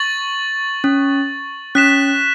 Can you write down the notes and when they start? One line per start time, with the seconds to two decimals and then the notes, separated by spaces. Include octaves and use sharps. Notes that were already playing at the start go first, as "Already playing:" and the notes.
Already playing: C#6 A6 F#7
0.84 C#4
1.75 C#4 F#6 B6 E7